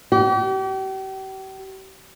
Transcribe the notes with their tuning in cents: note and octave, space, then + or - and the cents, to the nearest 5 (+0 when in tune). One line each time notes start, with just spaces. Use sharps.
G4 -40